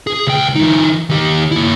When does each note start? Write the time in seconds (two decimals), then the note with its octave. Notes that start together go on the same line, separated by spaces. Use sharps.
0.07 G#4
0.27 C#2 G5
0.56 E3 D#4
1.10 D#3 G4
1.52 A#3 E4